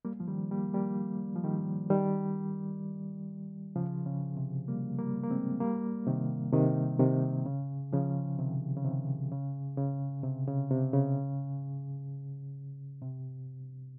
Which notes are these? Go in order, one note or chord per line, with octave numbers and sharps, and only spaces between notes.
G3 A#3
F3
D#3 G3
G3 A#3
G3 A#3
F3
D#3 G3
D#3 G3
C#3 F3
C#3
C3
G3 A#3
G3 A#3
A#3
G#3 C4
G3 A#3
C3 D#3
C3 D#3
C3 D#3
C#3
C#3 F3
C3 D#3
C#3
C3 D#3
C#3
C#3
C3
C#3
C3
C#3
C3